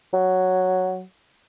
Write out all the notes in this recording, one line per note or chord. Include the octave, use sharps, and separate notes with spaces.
F#3